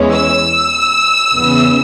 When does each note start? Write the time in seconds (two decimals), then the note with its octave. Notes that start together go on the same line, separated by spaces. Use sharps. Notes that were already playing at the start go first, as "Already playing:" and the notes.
Already playing: E2 E3 G#3 C#4
0.13 E6
1.34 E2 C#3 E3 B3